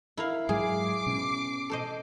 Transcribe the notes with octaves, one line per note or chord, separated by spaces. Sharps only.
E4 A#4 F5
G#2 F#3 G#3 G#4 D6 C7
B2 C#4
A4 C5 D#5